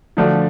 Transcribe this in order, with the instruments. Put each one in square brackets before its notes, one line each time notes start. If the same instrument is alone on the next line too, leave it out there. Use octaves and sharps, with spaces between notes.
[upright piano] D3 F3 A3 D4 F#4